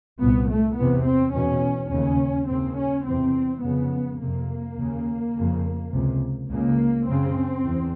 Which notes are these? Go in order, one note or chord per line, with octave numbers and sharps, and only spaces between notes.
C2 A#2 B3
A3
E2 C3 B3
C4
E2 B2 C#4
D#2 C#3 C#4
D#2 C#3 C4
C#4
E2 C3 C4
F2 C#3 B3
F2 C3 A#3
D#2 C#3
F2 C#3
C#2 C3
C#2 C#3 A#3
F#2 C#3 C4
E2